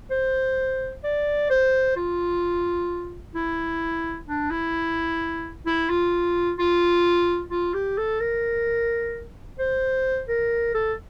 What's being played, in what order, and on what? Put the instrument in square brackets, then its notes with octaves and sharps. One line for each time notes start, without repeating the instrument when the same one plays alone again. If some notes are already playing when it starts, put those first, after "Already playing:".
[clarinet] C5
D5
C5
F4
E4
D4
E4
E4
F4
F4
F4
G4
A4
A#4
C5
A#4
A4